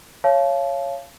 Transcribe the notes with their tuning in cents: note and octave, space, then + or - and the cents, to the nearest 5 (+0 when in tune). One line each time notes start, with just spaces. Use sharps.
C#5 +0 F5 -25 A5 -30